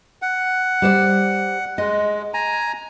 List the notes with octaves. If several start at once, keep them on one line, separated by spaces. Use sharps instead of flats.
F#5
G3 C5 D5
G#3 D#5
G#5 A#5